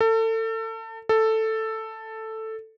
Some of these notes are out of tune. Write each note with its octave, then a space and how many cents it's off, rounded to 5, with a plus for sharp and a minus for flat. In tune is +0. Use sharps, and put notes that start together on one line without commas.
A4 +30
A4 +5